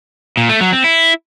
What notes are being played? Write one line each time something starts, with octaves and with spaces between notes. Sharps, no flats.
A#2
A3
F#3
C4
E4